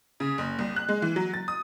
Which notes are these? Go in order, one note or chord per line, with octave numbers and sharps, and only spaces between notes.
C#3
F#1
C2
F#6
G#3
E3
F#3
A6
D#6